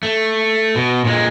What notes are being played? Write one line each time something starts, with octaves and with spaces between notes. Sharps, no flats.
A3
B2
A#2 G#3